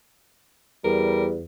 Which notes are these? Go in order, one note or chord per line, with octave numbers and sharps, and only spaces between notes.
E2 G3 A#4